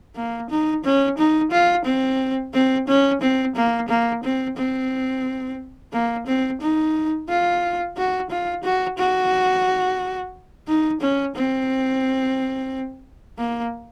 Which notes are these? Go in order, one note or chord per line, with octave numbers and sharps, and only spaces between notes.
A#3
D#4
C#4
D#4
F4
C4
C4
C#4
C4
A#3
A#3
C4
C4
A#3
C4
D#4
F4
F#4
F4
F#4
F#4
D#4
C#4
C4
A#3